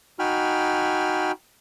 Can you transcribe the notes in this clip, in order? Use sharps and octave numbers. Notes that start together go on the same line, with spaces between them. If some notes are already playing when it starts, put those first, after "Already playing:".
D#4 F#4 G5 G#5 B5 F6